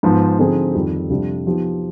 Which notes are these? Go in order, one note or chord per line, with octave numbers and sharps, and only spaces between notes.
G#2 F3 B3
D3 F3 C4 D#4 G#4
F2 D#3 G3 C4 G4
F2 C3 G3 D4 F4
F3 B3 D#4 G4